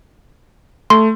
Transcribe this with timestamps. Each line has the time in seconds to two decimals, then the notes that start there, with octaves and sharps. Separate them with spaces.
0.90 A3 C6